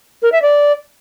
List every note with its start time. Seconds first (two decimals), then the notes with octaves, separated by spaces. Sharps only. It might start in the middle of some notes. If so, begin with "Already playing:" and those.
0.22 A#4
0.32 E5
0.42 D5